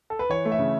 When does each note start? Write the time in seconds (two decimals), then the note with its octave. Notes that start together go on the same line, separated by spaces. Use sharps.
0.10 A4
0.19 B4
0.29 E3 C#5
0.45 A3
0.52 E5
0.59 C#3